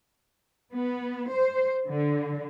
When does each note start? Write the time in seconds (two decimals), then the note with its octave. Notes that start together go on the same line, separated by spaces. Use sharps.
0.71 B3
1.29 C5
1.87 D3